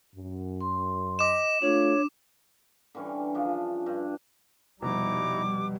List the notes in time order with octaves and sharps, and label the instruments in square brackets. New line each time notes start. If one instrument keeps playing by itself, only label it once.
[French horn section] F#2
[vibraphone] C6
[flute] D#5 [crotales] D6 E7
[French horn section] A3 F4 [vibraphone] D4 [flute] C#5
[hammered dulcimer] D3 E3 G3 C#4
C#3 F3 D4
G2
[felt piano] F1 B2 [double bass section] G3 [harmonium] D#4 E4 A#5 [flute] D6